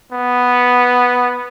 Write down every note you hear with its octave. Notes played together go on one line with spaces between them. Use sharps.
B3